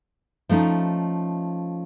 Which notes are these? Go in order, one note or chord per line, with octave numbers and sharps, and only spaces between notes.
F3 A3 C#4 D#4